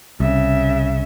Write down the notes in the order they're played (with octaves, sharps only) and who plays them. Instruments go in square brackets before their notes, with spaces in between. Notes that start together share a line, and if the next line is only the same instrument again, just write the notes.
[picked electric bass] C2 [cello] C#3 E5